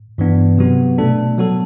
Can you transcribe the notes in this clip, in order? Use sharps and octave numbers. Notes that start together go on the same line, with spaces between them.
G2 E3 B3 D4
C3 F#3 B3 F#4
B2 A3 D4 A4
F#3 B3 F#4 A4